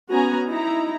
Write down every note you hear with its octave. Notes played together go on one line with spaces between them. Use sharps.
B3 C#4 F#4 G#5 A#5
D#4 E4 A#5